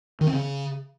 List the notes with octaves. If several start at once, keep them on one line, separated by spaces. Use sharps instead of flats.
D#3
C4
C#3